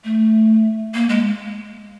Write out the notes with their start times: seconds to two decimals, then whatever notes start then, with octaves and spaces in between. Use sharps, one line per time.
0.04 A3
0.94 A#3
1.09 G#3